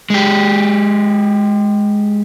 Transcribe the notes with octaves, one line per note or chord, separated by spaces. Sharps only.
G#3 G4